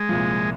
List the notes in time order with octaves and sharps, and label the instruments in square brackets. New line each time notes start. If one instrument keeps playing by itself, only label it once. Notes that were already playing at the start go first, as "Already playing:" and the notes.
Already playing: [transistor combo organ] G#3
[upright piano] C2 A#2 F3